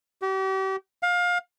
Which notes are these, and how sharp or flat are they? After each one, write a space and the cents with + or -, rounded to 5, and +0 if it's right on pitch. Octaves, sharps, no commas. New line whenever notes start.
G4 -40
F5 +25